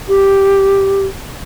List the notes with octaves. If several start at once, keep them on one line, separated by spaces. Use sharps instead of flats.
G4